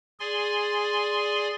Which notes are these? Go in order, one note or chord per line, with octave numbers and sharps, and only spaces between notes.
G#4 D5 G#5 C6